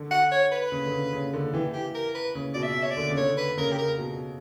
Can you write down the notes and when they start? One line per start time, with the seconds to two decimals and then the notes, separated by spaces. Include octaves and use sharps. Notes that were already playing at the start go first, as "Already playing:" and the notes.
Already playing: D3
0.11 F#5
0.32 C#5
0.52 B4
0.72 C#3
0.86 D3
0.92 C#3
1.13 C#3
1.34 D3
1.54 E3 G4
1.74 G4
1.95 A#4
2.15 B4
2.35 C#3
2.54 B2 D5
2.63 E5
2.83 C#5
2.90 D5
2.97 D3
3.10 C#3
3.16 D3 C#5
3.37 B4
3.57 C#3 A#4
3.72 G4
3.78 A#4
3.98 B2